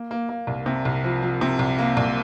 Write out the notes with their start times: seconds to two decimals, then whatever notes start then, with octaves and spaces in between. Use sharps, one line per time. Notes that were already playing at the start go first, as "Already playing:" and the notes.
Already playing: A#3
0.11 A#3
0.29 A#3
0.47 C2
0.66 C3
0.85 C2
1.04 F3
1.22 F3
1.41 C3
1.59 C2
1.78 A#3
1.97 C2